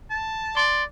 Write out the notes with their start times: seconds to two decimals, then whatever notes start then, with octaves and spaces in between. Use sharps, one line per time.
0.10 A5
0.57 D5 C6